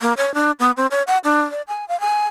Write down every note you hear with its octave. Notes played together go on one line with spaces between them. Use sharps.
A#3
C#5
D4
B3
C4
C#5
F#5
D4
D5
G#5
F5
G#5